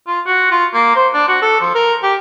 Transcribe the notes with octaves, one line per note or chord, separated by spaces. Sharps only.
F4
F#4
F4
A#3
C5
D4
F#4
A4
F3
A#4
G4